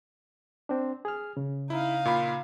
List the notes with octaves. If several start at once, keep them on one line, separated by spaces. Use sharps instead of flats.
C4 D4
G#4 F6
C#3
D#4 E4 F5
A#2 F4 B5